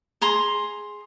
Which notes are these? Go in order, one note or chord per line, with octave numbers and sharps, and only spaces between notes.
G#4 A#5 C6